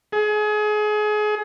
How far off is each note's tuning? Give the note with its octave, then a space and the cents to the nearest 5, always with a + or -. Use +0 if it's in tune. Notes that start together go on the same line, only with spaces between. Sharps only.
G#4 +30